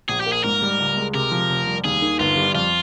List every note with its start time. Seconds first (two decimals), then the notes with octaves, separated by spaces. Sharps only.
0.09 A#1 G#4
0.20 G4
0.26 A#3
0.32 G#4
0.44 G#2 A#4
0.62 G3
0.79 C#2
0.97 G#3
1.14 C3 A#4
1.32 F3
1.49 F1
1.67 G3
1.84 D#2 G#4
2.02 D#3
2.19 G1 F4
2.37 G3
2.54 F2 F4